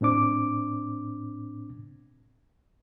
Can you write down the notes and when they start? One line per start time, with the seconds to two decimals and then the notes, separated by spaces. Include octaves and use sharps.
0.01 A2 C4 D4 D6